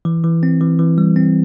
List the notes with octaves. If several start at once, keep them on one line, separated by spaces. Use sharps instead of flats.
E3
E3
C4
E3
E3
G3
C4